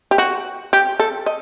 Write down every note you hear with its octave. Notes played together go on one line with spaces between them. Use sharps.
G4
F#4
G4
A4
D#5